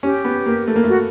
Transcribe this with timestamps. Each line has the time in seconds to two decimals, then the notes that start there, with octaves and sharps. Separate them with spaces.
0.03 C#4 G4
0.25 B3
0.46 A#3
0.67 A3
0.76 A#3
0.84 A3
0.89 F#4